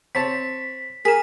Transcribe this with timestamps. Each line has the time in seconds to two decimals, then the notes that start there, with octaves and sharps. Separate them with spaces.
0.15 C4 C#5 A5 B6
1.05 G#4 A#4 B6 E7